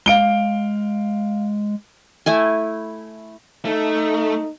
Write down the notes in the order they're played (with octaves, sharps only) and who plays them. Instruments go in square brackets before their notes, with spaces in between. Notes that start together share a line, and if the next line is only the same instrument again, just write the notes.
[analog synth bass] G#3 [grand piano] F5 D7 G7
[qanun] A3 E4 G#5
[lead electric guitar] A3 [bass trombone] D#4